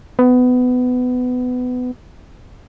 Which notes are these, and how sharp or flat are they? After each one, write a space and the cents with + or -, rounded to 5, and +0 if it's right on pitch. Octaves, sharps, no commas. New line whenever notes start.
B3 +20